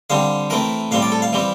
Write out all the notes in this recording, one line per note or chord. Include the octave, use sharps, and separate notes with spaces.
D3 G3 C4 F5
E3 A3 C4 A#4
A2 G3 C4 F5
D5
A4
F5
E3 G3 C4